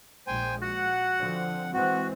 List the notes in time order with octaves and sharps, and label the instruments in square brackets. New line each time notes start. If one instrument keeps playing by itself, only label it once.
[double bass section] A#1 F3 G#3 [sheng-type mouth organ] C5 G5 G#5
[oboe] F#4 [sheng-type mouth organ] F#5
[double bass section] D3 F3 C4
[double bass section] E3 G#3 C4 [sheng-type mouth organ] F#4 [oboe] F#5